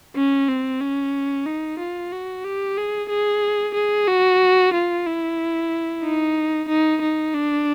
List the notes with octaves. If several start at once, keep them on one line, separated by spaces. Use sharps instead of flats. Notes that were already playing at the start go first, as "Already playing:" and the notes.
C#4
C4
C#4
D#4
F4
F#4
G4
G#4
G#4
G#4
F#4
F4
E4
D#4
D#4
D#4
D4